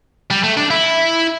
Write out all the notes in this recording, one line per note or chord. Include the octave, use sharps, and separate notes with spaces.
G3
A3
D4
E4